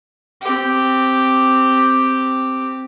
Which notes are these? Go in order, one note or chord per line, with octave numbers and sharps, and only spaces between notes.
C4 G4